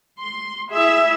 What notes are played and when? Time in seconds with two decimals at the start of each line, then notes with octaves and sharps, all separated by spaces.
0.17 C6
0.71 E4 G#4 E5